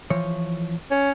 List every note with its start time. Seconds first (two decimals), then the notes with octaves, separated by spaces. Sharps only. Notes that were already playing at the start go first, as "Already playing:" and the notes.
0.10 E3 F3 C#5
0.91 C#4